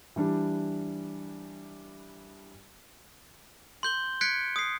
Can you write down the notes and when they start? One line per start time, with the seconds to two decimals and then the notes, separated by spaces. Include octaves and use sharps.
0.16 E3 G3 D4
3.83 C6 G6 G7
4.21 F#6 G#6 B6 C#7 D7
4.56 D#6 C7